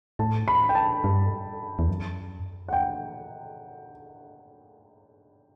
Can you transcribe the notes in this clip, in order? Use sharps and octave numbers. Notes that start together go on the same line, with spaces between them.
A2 A5
B5
G5
A5
G2
E2
F#2
F#5
G5